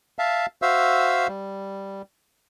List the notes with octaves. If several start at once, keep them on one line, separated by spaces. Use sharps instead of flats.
E5 F5 A5
F#4 C5 E5 F5 E6
G3